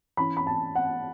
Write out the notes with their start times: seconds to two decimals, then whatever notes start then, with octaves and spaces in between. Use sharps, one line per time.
0.17 E3 C#4 B5
0.37 B5
0.47 A5
0.75 F#5